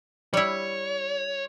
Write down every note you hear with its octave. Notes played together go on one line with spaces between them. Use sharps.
G3 E4 C#5